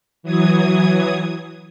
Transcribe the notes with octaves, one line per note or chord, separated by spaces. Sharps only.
E3 F#3 D#6 G#6